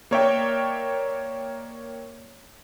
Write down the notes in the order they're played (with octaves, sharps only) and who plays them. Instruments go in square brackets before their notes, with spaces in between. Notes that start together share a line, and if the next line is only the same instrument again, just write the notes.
[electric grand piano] A#3 A#4 C#5 D5 E5 G5